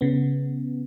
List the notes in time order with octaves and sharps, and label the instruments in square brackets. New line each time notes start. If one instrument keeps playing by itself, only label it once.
[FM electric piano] C#3 B3